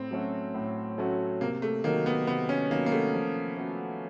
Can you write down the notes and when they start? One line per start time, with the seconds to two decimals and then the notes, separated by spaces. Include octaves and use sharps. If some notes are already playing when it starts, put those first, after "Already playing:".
Already playing: A2 C4
0.11 F#3 A3 C#4 F#4
0.55 A2
0.98 F#3 A3 C#4 F#4
1.41 C3 A#3
1.62 A3
1.84 D#3 F#3 A#3
2.06 B3
2.27 C3 B3
2.49 C#4
2.71 D#3 F#3 A#3
2.86 A#3
2.92 A3
3.14 F3
3.57 A3 C#4 F#4